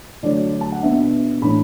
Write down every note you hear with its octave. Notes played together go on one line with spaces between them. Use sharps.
D3 F#3 A3 D4 D5
A5
F#5
B2 B3 D4 E5
A2 E3 A3 D4 B5